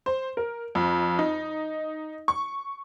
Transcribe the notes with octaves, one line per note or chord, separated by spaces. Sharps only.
C5
A#4
F2
D#4
C#6